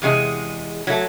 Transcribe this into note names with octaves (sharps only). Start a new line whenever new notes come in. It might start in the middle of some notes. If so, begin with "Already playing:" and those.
E2 C3 G#3 G#4
F#3 A3